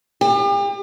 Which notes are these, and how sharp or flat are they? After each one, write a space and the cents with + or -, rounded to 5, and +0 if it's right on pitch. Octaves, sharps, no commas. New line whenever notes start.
G4 +40